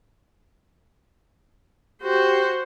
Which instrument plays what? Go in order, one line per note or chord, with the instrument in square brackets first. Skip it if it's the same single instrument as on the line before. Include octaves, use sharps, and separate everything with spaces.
[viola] F#4 C5 [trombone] G4